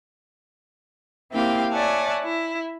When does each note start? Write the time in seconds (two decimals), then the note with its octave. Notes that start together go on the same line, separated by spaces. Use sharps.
1.33 A#3 C4 E4 G4 F5 G5
1.72 C#5 D5 E5 F#5 G#5 A5
2.23 E4